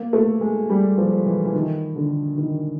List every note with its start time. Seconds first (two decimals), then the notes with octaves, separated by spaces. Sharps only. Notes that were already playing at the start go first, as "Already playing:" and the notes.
Already playing: A#3
0.13 A3
0.41 G#3
0.70 G3
0.98 F3
1.26 E3
1.45 E3
1.54 D#3
1.96 D3
2.38 D#3